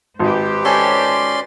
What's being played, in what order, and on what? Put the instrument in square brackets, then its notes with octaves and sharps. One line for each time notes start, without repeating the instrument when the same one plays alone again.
[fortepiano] G#1 [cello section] G4 B4 C5
[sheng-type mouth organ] C#4 D5 C6 [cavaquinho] A4 C#5 G#5